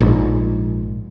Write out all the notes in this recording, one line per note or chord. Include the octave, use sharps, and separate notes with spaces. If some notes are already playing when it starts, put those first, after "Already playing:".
A#1 G#2